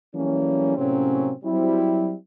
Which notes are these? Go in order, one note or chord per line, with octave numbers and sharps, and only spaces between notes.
E3 F#3 G3 A3 A#3 C#4
A2 C3 F#3 A#3 C4 C#4
F#3 G3 C4 E4